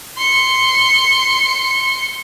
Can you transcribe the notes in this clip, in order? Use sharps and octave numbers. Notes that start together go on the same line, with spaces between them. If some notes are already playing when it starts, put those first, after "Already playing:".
C6 C#7